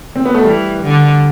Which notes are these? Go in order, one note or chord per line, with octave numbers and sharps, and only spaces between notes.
C4
B3
A3
E3 G3
D3